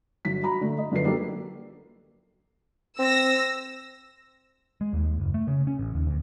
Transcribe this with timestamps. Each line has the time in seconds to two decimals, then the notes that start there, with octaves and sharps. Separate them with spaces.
0.25 G1 F#3 B6
0.43 F#4 A#5 B5
0.61 D3 A3
0.78 D#5
0.92 F#2 D3 F3 B4 C7
1.04 F#3 G3 A#3 D4 A4
2.99 C4 E6 A#6
4.81 G#3
4.93 D#2
5.20 F#1
5.34 A3
5.48 C#3
5.67 C#4
5.79 A1
5.94 D#2
6.07 D2